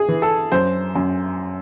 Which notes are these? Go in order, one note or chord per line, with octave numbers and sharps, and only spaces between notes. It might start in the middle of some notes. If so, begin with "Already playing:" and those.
Already playing: G#4
E3
A4
F#2 C5
F#2